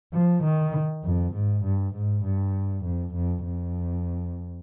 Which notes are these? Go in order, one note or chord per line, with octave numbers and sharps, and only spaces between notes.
F3
D#3
F2
G#2
G2
G#2
G2
F2
F2
F2